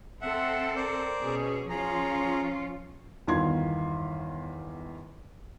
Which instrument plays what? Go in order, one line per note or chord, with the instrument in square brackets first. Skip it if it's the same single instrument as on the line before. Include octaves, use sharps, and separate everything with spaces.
[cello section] C4 A4 [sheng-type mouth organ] E5 F#5
[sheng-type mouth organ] A#4 C5 D5
[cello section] B2 C#4 G#4
[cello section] F3 C#4 F4 [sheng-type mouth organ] G#4 A#5
[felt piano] G1 E2 D#3 F4 C6 G#6